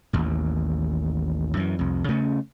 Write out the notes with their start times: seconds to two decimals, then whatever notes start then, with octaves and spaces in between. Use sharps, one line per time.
0.13 A1 D#2
1.57 F#2 E3
1.79 C2 F2
2.08 C#3 A3 C#4